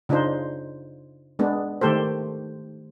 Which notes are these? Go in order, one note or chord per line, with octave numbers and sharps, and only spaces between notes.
C#3 D4 D#4 F4 C5
G#3 B3 D4
D#3 A3 G4 A4 C5